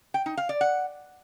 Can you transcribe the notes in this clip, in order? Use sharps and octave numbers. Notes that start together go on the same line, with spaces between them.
G5
D#4
F5
D5
F#5